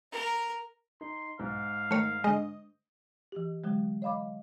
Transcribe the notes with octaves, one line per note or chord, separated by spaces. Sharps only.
A#4
D#4 C6
B1 G#2 F5
D#3 A3 A#4 C#5
D3 G#3 D#5
E3 G4
D3 F#3 G#3
C#5 D#5 F5 B5 D6